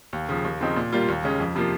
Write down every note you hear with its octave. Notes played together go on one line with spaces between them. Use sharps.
D#2
C#3 F3
D#2
C#3 F3 C4 D#4
A#2
G3 A#3 F4
D#2
C#3 G#3 C#4
F2
C3 F3 A#3 F4